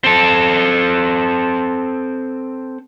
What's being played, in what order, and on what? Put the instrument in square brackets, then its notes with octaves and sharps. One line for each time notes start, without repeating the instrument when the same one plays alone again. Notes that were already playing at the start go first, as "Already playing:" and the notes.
[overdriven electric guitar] C4 A4